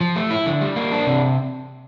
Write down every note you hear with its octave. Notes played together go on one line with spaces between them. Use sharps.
F3
A3
E4
D3
G3
A#3
D4
C3